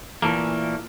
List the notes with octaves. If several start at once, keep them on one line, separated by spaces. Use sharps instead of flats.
A#2 E3 A3 A#3